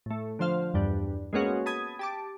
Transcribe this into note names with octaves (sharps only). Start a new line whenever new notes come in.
A2 A3
D3 F3 C5 F5
E2 G2 G3 D4
G#3 A#3 B3 C#4 F#4 G#4
A5 B5 D#6 G#6
G4 A5 D6